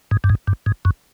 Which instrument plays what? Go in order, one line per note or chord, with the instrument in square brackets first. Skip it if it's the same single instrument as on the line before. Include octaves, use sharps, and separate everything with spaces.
[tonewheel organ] G#2
G2
G#2
G2
G#2
F#2